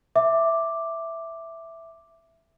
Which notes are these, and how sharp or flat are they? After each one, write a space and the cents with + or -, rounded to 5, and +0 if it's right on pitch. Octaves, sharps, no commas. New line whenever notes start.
E5 +0 D6 +0